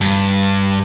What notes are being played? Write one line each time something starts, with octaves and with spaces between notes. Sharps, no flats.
G2